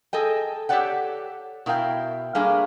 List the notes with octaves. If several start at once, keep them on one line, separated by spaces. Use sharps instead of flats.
G#4 A4 D#5 G5
G4 A4 C#5 D5 F#5 G5
B2 E4 A#4 F5 G5
G3 A3 A#3 D4 G#4 F5